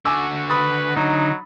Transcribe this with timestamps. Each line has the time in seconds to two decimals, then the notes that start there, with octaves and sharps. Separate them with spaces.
0.05 D3 F#4 G#5 D6 E6
0.49 B4 B5 D#6 A6
0.97 F#3 D#4